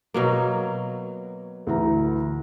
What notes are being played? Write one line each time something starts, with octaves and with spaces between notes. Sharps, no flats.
B2 F#3 A#3
D2 E3 A#5